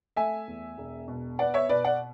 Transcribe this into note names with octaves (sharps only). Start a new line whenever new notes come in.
A3 E5 G#5
E2
E1
B2
B3 D5 F#5
C#5 E5
B2 B4 D5
D5 F#5